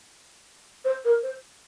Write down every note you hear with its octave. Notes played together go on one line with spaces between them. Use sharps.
C5
A#4
C5